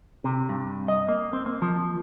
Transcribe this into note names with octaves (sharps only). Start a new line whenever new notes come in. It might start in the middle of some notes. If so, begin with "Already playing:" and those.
C3
G2
D#5
A#3
C4
A#3
F3